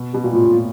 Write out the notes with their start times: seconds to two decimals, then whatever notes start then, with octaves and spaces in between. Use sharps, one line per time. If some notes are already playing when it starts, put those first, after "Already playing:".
Already playing: B2
0.13 B2 G4
0.23 A#2 F#4
0.32 A2 F4
0.44 B2
0.53 A#2